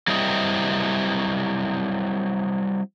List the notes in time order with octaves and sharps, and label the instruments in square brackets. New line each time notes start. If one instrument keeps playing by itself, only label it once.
[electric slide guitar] F#3 G3 C4 E4 D#5